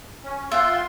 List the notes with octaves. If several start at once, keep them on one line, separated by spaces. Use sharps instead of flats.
C#4
F4 E5 F#5 G5 C6